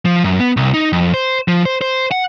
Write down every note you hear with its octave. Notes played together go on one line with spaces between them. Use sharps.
F3
F#2
B3
C2
D#4
F2
C5
F3
C5
C5
F#5